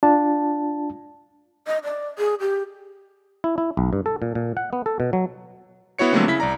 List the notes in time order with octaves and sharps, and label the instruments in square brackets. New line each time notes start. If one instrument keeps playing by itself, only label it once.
[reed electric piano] D4 F4 A5
[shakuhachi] D#5
D5
G#4
G4
[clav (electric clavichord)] E4
E4
B1
G2
A4
A#2
A#2
F#5
B3
A4
B2
F#3
[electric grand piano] B3 E4 F#4 C#5 C#7
D3 F#3 G3 A3 A#3 C4
C#3 E4 B6
C2 D5 A#5